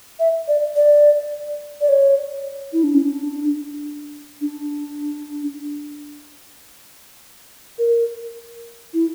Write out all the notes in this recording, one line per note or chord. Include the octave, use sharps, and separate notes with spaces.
E5
D5
D5
D5
C#5
E4
D4
C#4
D4
D4
A#4
E4